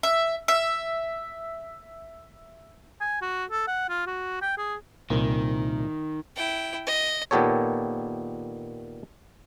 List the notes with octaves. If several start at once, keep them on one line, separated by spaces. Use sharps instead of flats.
E5
E5
G#5
F#4
A4
F#5
F4
F#4
G5
G#4
C2 A#2 D#3
E4 G5
D#5
A#2 D#3 B3 G4 A4 C#5